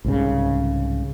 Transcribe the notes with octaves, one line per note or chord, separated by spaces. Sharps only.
C2 G#2 C#3